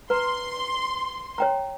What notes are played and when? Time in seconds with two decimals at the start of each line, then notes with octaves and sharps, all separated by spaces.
0.10 B4 A#5 C6
1.38 C#5 G5 A#5